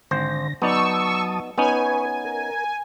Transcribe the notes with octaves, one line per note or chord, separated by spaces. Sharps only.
G#1 D3 C5 A#6
F#3 B3 D#4 D5 A5 C#6 D#6 E6
B3 C#4 D#4 B4 C#5 G#5
A#4